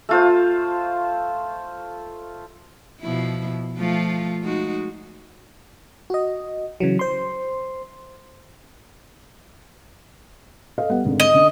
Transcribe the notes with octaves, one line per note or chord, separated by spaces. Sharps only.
A3 F4 C5
B2 F3 E4
F3 A3 F4
G#3 D#4 F#4
F#4 D#5
C#3 E3 F#3
C5 C6
A4 D#5 F5
G3 B3 F#5
G#1 G#2 D3
D#5
D3